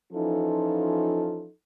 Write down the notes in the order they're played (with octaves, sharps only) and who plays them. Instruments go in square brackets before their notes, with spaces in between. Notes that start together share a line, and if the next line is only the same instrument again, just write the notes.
[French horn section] E3 F3 C#4 D#4 F4 A4